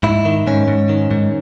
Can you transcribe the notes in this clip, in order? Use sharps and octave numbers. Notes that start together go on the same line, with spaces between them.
G#2 E4
D#3
G#2 C#4
G#2
D#3
G#2